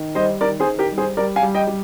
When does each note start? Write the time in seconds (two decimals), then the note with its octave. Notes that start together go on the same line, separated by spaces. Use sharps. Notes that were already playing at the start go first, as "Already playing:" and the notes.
Already playing: D#3
0.15 G3 C5 D#5
0.41 D#3 A#4 D5
0.60 G#4 C5
0.67 D#3
0.79 G4 A#4
0.91 G3
0.98 G#4 C5
1.17 G3 A#4 D5
1.36 F5 G#5
1.42 G3
1.55 D#5 G5
1.67 G3